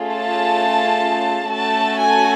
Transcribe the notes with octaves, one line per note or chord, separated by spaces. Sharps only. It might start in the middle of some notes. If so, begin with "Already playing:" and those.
Already playing: A3 C#4 F4 G#4
A5
A3 C#4 F#4 A4 A5
G#5